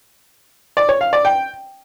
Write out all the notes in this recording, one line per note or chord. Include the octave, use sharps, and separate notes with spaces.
D5
C#5
F5
D5
G5